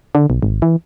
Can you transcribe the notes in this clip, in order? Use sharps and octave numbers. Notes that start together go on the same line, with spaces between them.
D3
B1
G#1
E3